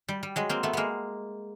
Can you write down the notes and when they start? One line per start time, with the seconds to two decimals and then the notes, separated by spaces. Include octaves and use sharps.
0.08 G3
0.23 G3
0.36 F#3 G#3
0.49 A#3 C4
0.63 A3 B3
0.73 G#3 A#3 B3